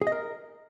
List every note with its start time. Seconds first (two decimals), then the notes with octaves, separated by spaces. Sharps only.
0.01 G#4
0.07 D#5
0.12 A#4